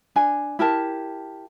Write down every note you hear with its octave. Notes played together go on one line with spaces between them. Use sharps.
D4 G#5
E4 G4 A#4 A5